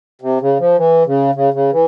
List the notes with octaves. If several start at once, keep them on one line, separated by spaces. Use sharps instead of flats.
C3
C#3
F3
E3
C#3
C#3
C#3
E3